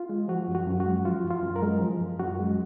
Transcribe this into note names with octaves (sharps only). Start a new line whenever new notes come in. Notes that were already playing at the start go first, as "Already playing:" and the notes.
Already playing: F4
G#3
F3 F#4
F#2
F#4
F#2
F#4
G#3
F3 F4
F#2
F4
F#2
A#4
G#3
F3
F#2
F#2 F#4
G#3